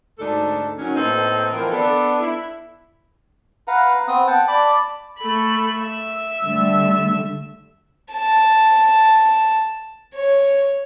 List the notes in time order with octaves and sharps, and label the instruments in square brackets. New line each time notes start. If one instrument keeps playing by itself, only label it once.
[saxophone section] D2 G#2 D4 D#4 A4
D#3 F#3 C#4
A2 A#3 C4 A4 B4 D#5
D3 E3 F3 C4 A#4
B3 D4 A4
E4
[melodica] B4 F5 F#5 A#5
B3 C4 D#6
F#5 G5 A5
D5 A5 B5 D6
[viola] A3 B5
E5
[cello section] D3 G3 A3
[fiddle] A5
C#5